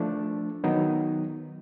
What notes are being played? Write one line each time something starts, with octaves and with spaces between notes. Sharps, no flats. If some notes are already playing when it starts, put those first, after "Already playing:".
Already playing: F3 A3 D4
D#3 F#3 B3 D#4